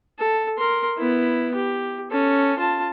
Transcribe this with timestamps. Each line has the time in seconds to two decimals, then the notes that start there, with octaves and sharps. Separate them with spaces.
0.19 A4
0.58 A#4 C6
0.98 B3 E4
1.55 G4
2.11 C#4 A4
2.59 F4 A5